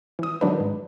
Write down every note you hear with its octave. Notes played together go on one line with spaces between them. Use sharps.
E3 D#6
D#3 F#3 D4 B4
G#2